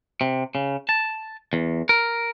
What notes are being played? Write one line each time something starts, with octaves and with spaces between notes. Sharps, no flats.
C3
C#3
A5
E2
A#4